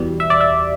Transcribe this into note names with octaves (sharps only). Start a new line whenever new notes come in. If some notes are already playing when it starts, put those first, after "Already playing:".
Already playing: E2 B2 G3
E5
D5
E5